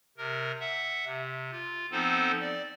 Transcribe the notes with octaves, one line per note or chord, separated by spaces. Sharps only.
C3 A#4
E5 F#5
C3
F4
F3 B3 C4 D#4 A4 C5
D5